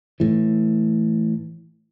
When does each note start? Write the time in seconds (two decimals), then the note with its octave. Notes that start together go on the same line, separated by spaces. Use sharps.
0.20 A2 E3